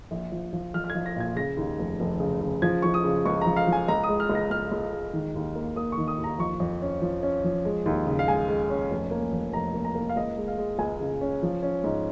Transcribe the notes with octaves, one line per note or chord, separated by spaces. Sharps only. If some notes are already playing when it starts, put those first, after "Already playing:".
A#1
F3
F3
F3 F6
F6
G#6
F3
A#6
A#2 G#6
C#3 A#6
D#2
F1
F1
C#3
C#3
F3 G#6
F3 C#6
D#6
C#3
C#2 C#6
F3 A#5
F5
F3
G#5
C#2 A#5
D#6
G#3
F6
C#2
A#6
C#2 F6
C#2
G#3
D#3
D#2
A#3
A#3 D#6
C#6
D#3
D#6
D#2
A#5
F3 C#6
F2
C#4
F3
C#4
F3
G#3
D#2
C#3
F5
G#3 G#5
G#3
C#4
F1
A#3
F2
F1 A#5
A#3
A#5
A#3
F5
C#2 D#5
G#3
F5
G#3
C#2 G#5
C#3
C#4
F3
C#4
G#2